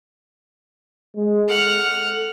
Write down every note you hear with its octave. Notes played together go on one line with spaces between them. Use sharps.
G#3
A4 F#5 F6